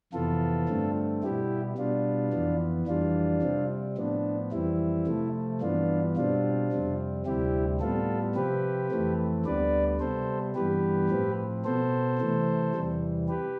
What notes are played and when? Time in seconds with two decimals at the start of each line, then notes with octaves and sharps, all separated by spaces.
0.13 F2 C3 E3 B3 F4 A4
0.68 G2 D3 A3 C4
1.23 B2 G3 B3 E4 G4
1.77 B2 G3 B3 D4 F4
2.32 F2 E3 B3
2.87 F2 E3 G3 D4 F4
3.42 C3 G3 C4
3.98 A2 F3 B3 D4
4.52 F2 E3 G3 C4 E4
5.07 C3 F3 A3
5.61 G2 E3 B3 D4 F4
6.17 B2 G3 C4 D4 F4
6.71 F2 C3 G3 C4
7.26 D2 C3 G3 C4 E4 G4
7.80 A2 G3 B3 F4 A4
8.36 C3 F3 C4 G4 B4
8.91 F2 E3 A3 C4
9.45 D2 D3 G3 B3 B4 D5
10.00 C3 G3 B3 A4 C5
10.55 G2 E3 G3 B3 G4 B4
11.09 A2 F3 C4
11.65 B2 B3 A4 C5
12.19 C3 E3 A3
12.74 E2 C3 E3 G3
13.28 G4 B4